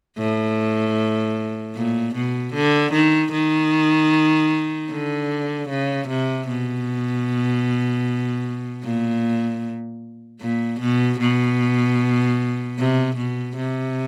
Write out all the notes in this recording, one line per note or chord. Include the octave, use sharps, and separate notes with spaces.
A2
A#2
B2
D3
D#3
D#3
D3
C#3
C3
B2
A#2
A#2
B2
B2
C3
B2
C3